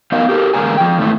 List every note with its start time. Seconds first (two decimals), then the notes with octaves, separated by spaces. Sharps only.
0.12 F#3 B3 D#4 A#4 D#5 F5
0.29 G4 A4 A#4
0.54 E2 D3 G#3 A#3 A#4 G#5
0.77 F3 G5
0.98 E2 G#2 D#3 A3 D#4 E4